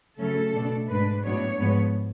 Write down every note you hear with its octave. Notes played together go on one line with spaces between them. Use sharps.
C#3 F#3 A3 C#4 A4
B2 A3 D4
G#2 G#3 D4 B4
A2 F#3 B3 D4 C#5
G#2 F3 G#3 B3